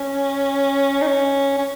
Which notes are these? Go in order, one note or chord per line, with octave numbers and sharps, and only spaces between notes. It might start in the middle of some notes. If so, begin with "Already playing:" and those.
Already playing: C#4
D#4
C#4
C#4